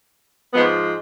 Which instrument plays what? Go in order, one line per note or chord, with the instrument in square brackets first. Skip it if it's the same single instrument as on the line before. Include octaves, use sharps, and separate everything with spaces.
[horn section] G#2 F3 G#3 B3